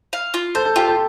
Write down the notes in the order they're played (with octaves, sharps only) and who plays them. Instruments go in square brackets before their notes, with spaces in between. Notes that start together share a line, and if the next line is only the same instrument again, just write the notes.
[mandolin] F5
F4
[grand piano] A4 A5 [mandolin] C5
[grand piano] A4 A5
[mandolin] F4 [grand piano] G4 G5
[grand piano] A4 A5